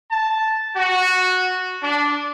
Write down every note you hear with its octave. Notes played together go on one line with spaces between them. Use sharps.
A5
F#4
D4